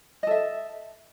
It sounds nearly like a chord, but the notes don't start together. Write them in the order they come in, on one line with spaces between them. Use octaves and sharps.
D#5 A4 E5